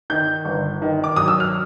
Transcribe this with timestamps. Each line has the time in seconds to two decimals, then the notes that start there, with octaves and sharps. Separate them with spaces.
0.10 D#3 G6
0.45 G1
0.82 D#3
1.04 D6
1.16 F#3 D#6
1.28 E6
1.40 F6